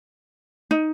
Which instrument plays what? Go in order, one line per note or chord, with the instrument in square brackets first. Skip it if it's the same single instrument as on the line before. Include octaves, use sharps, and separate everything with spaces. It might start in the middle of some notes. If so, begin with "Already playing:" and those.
[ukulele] D#4